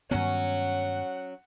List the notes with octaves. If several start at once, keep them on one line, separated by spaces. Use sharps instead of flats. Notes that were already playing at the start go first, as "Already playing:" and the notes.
G2 D#3 F#3 B3 C#4 F#5